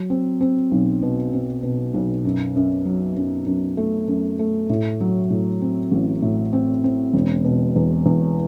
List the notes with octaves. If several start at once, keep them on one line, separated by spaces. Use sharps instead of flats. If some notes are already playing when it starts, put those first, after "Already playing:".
Already playing: F#3
C4
C4
B1
B2
C4
B2
B1
F#2
F#2
F#3
F#2
F#2
A3
F#2
A3
A2
F#3
A2
C4
A1
A2
C4
C4
E1
B2
E2
E2